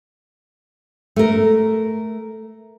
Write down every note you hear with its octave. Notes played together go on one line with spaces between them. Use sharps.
A3 A#4